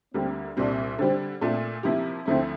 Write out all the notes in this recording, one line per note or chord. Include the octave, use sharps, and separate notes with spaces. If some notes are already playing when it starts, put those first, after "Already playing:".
D2 D3 G3 A#3 C4
C2 A#2 G3 C4 D4
D3 G3 C4 D4
A#2 A3 C4 D4 F4
C3 F3 A#3 E4 G4
D2 D3 F3 A3 C4 E4